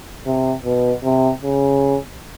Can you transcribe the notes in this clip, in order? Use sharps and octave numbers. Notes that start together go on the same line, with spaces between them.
C3
B2
C3
C#3